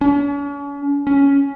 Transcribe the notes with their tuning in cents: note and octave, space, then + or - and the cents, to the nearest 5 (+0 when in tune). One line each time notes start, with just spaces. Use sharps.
C#4 +40
C#4 +10